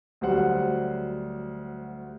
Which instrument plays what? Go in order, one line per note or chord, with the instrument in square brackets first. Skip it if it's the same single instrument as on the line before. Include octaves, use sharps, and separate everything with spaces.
[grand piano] D2 F#3 G3 C5 F#5